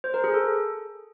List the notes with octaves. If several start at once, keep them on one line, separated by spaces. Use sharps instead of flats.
C5
A#4
G#4
A4